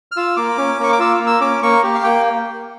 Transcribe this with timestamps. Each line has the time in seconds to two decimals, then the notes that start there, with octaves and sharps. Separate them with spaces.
0.12 F6
0.17 F4 E6
0.37 A#3 D6
0.58 C#4
0.79 A#3 C#6
0.93 D6
0.99 F4 E6
1.20 A#3
1.27 E6
1.41 C#4 D6
1.63 A#3 C#6
1.84 G4
1.95 F5
2.03 A#3 G5